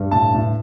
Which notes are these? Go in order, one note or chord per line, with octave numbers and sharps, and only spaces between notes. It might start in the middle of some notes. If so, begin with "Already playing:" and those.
Already playing: G2
A2 A5
A2